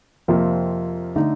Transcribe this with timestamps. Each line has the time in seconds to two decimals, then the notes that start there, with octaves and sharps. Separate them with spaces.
0.28 F2 C3 F3 A#3
1.16 D3 A3 D#4